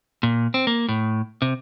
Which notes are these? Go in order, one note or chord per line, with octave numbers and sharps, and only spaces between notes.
A#2
C4
A#3
A2
C3